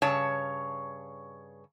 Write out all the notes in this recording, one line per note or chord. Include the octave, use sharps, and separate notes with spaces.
G2 C#3 C#5 A5